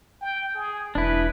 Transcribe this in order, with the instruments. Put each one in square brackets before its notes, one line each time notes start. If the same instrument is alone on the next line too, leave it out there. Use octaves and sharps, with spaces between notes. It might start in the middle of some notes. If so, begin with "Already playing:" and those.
[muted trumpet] G5
G#4
[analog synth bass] E1 [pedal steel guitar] D4 E4 [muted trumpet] B4